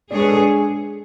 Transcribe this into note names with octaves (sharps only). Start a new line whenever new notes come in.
G#3 D4 G#4 C#5 D5
B4
A4
G#4